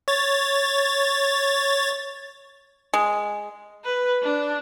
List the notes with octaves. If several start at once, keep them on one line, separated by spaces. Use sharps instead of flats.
C#5 A6
G#3
B4
D4